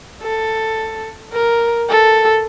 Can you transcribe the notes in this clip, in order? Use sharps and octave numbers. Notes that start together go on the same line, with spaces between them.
A4
A#4
A4